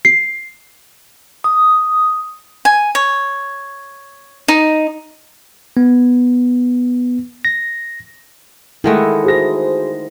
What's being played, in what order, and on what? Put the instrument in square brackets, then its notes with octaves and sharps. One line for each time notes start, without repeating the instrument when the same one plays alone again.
[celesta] C7
[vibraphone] D#6
[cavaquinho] G#5
C#5
D#4
[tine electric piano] B3
A#6
[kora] D#3 G#3 A3 [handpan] E4 F#5
[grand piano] F#4 G#4 A#6 [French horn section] C5